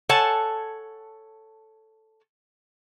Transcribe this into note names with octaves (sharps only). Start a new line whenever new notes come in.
A4 C#5 F#5 G#5 A5